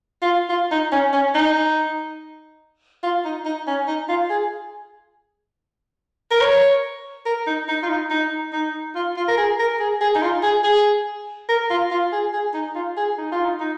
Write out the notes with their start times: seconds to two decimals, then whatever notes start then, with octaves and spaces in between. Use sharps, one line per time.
0.22 F4
0.49 F4
0.71 D#4
0.92 C#4
1.13 C#4
1.35 D#4
3.03 F4
3.25 D#4
3.45 D#4
3.67 C#4
3.88 D#4
4.09 F4
4.30 G#4
6.31 A#4
6.41 C#5
7.26 A#4
7.47 D#4
7.68 D#4
7.83 F4
7.89 D#4
8.10 D#4
8.53 D#4
8.95 F4
9.16 F4
9.28 A#4
9.38 G#4
9.59 A#4
9.80 G#4
10.01 G#4
10.15 D#4
10.22 F4
10.43 G#4
10.64 G#4
11.49 A#4
11.70 F4
11.91 F4
12.12 G#4
12.33 G#4
12.54 D#4
12.75 F4
12.97 G#4
13.18 D#4
13.32 F4
13.45 D#4
13.60 D#4